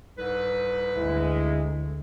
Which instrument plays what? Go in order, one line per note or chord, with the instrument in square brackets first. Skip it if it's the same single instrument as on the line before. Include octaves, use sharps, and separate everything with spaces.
[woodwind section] C2 G#2 B4
[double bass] D2 [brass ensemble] G#3 E4